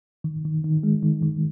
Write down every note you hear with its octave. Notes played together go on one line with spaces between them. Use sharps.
D#3
D#3
D#3
G#3
D#3
D#3